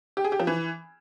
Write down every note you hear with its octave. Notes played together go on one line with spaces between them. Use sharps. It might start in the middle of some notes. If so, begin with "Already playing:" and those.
G4
G#4
G4
F3
E3